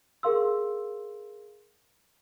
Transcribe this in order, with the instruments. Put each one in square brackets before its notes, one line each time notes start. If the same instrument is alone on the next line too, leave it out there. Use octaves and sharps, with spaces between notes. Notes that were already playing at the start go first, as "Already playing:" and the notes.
[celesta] G#4 A#4 F5 C6 E6